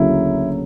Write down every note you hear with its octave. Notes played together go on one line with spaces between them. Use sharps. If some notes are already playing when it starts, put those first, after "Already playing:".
Already playing: D2 C#3 F#3 A#3 E4